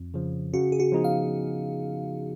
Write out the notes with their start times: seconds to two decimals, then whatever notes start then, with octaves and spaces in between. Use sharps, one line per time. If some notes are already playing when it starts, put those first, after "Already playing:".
Already playing: F2
0.14 C#3 F3
0.54 C#3 F#4
0.72 G#4
0.80 F#4
0.92 F3 B3 D#4 G#4
1.04 F5